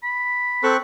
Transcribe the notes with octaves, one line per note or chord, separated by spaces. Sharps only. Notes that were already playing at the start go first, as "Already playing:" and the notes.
B5
C4 A4 C#6 F#6